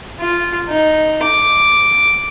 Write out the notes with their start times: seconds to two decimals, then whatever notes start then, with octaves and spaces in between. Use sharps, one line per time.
0.20 F4
0.69 D#4
1.23 D6